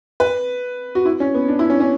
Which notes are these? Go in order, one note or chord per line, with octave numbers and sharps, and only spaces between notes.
B4
F#4
E4
C#4
B3
D4
E4
C#4
C#4